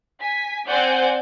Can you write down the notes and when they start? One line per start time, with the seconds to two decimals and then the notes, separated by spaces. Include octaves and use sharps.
0.20 G#5 B6
0.67 C4 C5 D5 F#5 G#5 G6